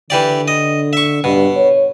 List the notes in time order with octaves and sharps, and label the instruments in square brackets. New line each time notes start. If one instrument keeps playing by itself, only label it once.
[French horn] D3 [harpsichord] E3 G4 D5
[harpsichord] D#5
E5 C#6
[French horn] G2 [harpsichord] B2
[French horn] C#5